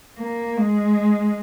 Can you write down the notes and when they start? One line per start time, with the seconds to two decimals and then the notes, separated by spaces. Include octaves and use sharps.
0.18 A#3
0.57 G#3